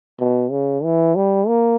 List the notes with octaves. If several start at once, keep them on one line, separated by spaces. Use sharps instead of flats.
B2
C#3
E3
G3
A#3